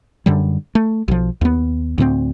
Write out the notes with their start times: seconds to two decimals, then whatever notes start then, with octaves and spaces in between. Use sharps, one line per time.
0.26 F#2 D3 G3
0.75 A3
1.08 B1 F3
1.41 D#2 B3
1.98 D2 A2 A3 C4